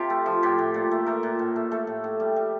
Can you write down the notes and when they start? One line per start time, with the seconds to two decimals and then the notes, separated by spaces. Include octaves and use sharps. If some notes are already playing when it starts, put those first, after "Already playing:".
Already playing: C3 F4 G4 A4
0.10 A3
0.26 F3
0.43 A2 G4
0.59 A2
0.74 A#2
0.91 A3
1.06 A3 A#4
1.23 A#2
1.39 A2
1.56 A3
1.72 A3 A4
1.87 A2
2.04 A2
2.20 G3
2.36 G3